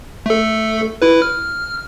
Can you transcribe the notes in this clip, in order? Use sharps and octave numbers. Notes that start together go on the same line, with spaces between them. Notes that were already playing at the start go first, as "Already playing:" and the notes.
A3 A4
E4 B4
F6